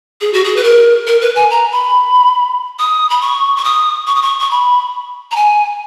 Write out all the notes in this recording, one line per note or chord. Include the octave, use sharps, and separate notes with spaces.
G#4
F#4
G#4
B4
A#4
A#4
B4
G#5
A#5
B5
D#6
B5
C#6
C#6
D#6
C#6
D#6
C#6
C#6
B5
A#5
G#5